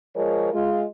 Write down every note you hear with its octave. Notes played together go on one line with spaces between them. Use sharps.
F3 G#3 A#4 C#5
G#3 F4